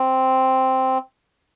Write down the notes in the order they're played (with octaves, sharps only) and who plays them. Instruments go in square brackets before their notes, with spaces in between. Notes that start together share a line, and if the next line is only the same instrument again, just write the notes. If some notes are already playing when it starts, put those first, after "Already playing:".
Already playing: [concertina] C4